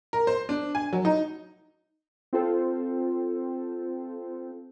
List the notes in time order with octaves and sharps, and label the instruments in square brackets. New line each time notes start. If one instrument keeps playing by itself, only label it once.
[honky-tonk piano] A#4
C5
D4
G#5
F#3
D#4
[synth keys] C4 F4 A4 C5